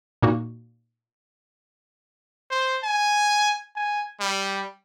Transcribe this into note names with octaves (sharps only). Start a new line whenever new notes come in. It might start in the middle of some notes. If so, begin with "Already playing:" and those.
A#2 A#3 D#4 F#4
C5
G#5
G#5
G3